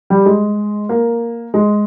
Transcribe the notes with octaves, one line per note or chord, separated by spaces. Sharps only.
G3
G#3
A#3
G#3